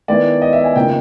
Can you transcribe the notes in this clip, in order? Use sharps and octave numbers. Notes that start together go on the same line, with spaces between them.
D#3 G#3 B3 E4 D5
D#5
E5
G#5
F2 C#3 F3 A#3 D#4 G5